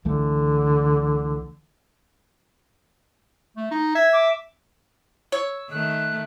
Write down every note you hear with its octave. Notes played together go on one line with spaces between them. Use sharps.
C#2 D3 E3 A3
A3
D#4
E5 G#6
D6
C#5 E6
D#3 A3 F#6